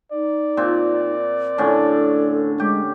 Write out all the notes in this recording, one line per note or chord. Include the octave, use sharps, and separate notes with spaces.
D#4 D5
A#2 C4
A2 D3 C#4 A4
G#3 G4